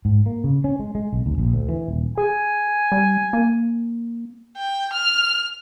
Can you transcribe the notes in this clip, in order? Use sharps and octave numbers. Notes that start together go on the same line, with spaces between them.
G#2
A#3
C#3
C#4
G#3
G#3
B1
D2
A#1
D2
E3
D#1
G#4 G#5
G3
A#3
G5
F6